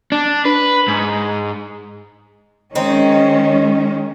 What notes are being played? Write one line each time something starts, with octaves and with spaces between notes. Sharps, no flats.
D4
B4
G#2
D#3 G#3 C4 C#4 D#4